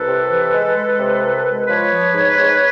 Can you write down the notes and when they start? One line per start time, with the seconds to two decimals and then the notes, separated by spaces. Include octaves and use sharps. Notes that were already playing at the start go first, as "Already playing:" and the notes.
Already playing: C2 A4 B4
0.08 C3
0.31 E3
0.54 G#3
0.76 G#3
0.99 C3
1.23 C2
1.46 G#3
1.68 F3 B4 C#5
1.91 F3
2.14 G#2
2.37 G#2